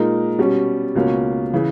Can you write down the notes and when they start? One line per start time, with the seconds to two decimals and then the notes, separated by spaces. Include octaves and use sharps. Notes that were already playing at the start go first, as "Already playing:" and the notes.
Already playing: A#2 G#3 D#4 A#4
0.39 B2 G3 C#4
0.95 C#2 B2 A#3 C#4
1.54 C#3 E3